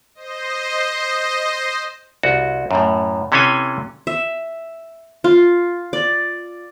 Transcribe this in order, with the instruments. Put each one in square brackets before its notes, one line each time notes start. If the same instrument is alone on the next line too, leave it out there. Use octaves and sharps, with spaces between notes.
[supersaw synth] C5 D#5
[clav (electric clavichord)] C2 F#4
F#2 A2
C3 E3 C#4 A4 F5 G#5
[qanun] E5
F4
D5